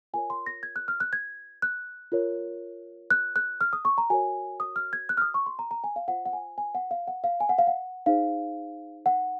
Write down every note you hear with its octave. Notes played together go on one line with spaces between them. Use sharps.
F4 A#4 C#5 G#5
C6
A#6
G#6
F#6
F6
F#6
G#6
F#6
F4 A#4 C#5
F#6
F#6
F6
D#6
C#6
A#5
F#4 A#4 C#5 G#5
D#6
F6
G#6
F#6
F6
D#6
C#6
C6
A#5
A#5
G#5
F5
F4 C5 F#5
F#5
G#5
G#5
F#5
F5
F#5
F5
G#5
F#5
F5
F#5
D#4 G#4 C5 F5
F#5